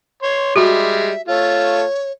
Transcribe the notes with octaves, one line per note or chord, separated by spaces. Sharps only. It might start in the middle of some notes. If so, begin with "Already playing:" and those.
C#5 C6
G3 G#3 F#4 G4 E5
A3 F4 A4 C#5